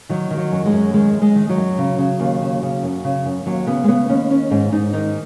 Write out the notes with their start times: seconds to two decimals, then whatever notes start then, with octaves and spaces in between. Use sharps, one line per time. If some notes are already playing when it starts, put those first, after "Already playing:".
0.09 D#3 F#3
0.31 D#3
0.37 F#3
0.52 F#2
0.66 G#3
0.73 F#2
0.94 D#3 G#3
1.15 F#2
1.22 G#3
1.35 D#3
1.49 F#3
1.57 F#2
1.78 C#3
1.99 C#3
2.20 D#2
2.41 C#3
2.62 C#3
2.83 F#2
3.04 C#3
3.25 F#2
3.46 D#2 F#3
3.67 C#3 B3
3.84 G#3
3.88 C#3 B3
4.09 D#2 C#4
4.30 D#3 C#4
4.51 G#2 D#4
4.72 G#2 D#4
4.93 D#3 D#4